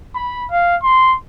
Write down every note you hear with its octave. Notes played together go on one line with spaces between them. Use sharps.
B5
F5
C6